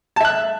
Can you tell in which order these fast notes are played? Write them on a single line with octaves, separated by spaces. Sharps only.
A5 E5 F#6